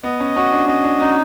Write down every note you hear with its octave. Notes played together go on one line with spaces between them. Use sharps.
B3 D#5
C#4
C#4 F#4
D4
C#4 D#5
D4
C#4 D#4